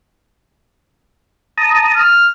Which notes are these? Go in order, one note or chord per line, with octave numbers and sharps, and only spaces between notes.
A5 A#5 D#6
F6